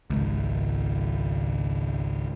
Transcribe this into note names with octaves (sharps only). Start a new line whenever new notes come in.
G#1 C#2